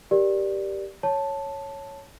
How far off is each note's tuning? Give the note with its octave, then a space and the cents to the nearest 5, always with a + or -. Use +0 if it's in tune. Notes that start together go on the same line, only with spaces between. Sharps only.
G4 +0 A#4 +20 D5 +0
C#5 +0 A5 +0